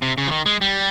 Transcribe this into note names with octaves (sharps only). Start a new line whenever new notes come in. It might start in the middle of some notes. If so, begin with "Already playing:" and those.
C3
C#3
F3
D#3
G#3
G3